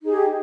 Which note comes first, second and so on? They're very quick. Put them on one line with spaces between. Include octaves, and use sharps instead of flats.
D#4 G#4 G4